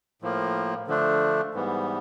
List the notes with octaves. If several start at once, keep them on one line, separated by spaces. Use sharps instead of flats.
A2 F3 A#3
D3 F3 A3 D4
G#2 E3 G3 B3